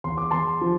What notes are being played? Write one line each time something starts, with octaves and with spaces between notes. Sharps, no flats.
E2 C6
D6
E2 A5 C6
F3